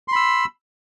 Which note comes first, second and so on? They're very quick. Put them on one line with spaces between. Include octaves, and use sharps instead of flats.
C6 B5 E6